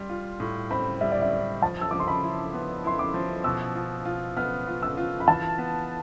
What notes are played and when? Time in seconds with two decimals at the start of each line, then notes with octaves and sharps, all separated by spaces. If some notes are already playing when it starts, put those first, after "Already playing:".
Already playing: G3 C6
0.09 F4
0.40 A2
0.71 C4 B5
1.01 G3 E5
1.12 D5
1.22 E5
1.32 C4
1.62 F3 A5
1.81 E6
1.91 F3 D6
2.00 C6
2.08 B5
2.23 E4
2.53 B3
2.84 E4 C6
2.99 D6
3.14 F3
3.44 B2 E6
3.75 F4
4.05 F4
4.37 B3 F6
4.67 F4
4.83 E6
4.98 F4
5.20 B5
5.28 E3 A5
5.58 B3